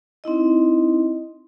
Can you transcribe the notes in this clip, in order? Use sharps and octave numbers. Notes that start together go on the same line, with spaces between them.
C4 D#4 E4 D#5